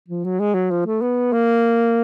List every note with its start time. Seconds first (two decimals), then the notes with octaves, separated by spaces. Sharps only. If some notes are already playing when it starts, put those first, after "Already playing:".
0.08 F3
0.24 F#3
0.40 G#3
0.55 F#3
0.71 F3
0.86 A3
1.01 B3
1.33 A#3